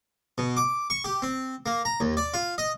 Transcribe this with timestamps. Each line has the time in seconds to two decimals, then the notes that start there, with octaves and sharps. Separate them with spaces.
0.38 B2
0.57 D6
0.90 C#6
1.04 G4
1.22 C4
1.66 A#3
1.85 A#5
2.00 D#2
2.17 D5
2.34 F4
2.58 D#5